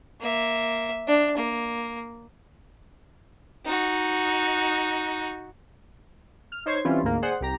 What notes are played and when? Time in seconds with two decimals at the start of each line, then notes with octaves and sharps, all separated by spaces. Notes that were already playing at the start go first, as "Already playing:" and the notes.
0.20 A#3 E5
1.07 D4
1.36 A#3
3.66 D#4 F#4
6.52 F6
6.66 D#4 C5 C#5 G#6 C7
6.85 E3 G3 C4 C#4 E4 F4
7.03 D2 G#2 A#3
7.22 G#4 C5 D5 F#5
7.41 C2 G4 A#5